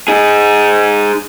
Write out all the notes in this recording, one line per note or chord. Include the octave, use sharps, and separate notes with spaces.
D#4 G#4